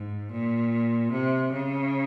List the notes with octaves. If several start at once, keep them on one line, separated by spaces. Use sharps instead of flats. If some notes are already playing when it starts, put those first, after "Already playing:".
Already playing: G#2
A#2
C3
C#3